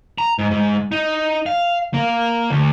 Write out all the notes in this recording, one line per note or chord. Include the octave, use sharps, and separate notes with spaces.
A#5
G#2
G#2
D#4
F5
A#3
D2